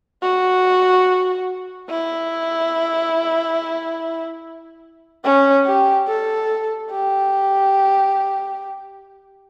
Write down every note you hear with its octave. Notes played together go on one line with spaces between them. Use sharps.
F#4
E4
C#4
G4
A4
G4